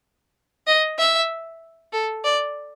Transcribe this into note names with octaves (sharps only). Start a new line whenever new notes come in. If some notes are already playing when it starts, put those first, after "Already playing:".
D#5
E5
A4
D5